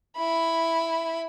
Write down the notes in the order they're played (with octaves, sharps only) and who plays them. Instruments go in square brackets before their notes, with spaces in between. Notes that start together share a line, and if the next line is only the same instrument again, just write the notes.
[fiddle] E4 B5